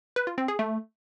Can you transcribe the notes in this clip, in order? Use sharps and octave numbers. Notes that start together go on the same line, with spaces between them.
B4
F4
C4
G#4
A3